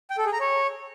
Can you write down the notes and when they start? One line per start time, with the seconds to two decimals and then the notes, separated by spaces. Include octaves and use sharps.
0.10 G5
0.18 A4
0.25 G#4
0.33 A#5
0.40 C#5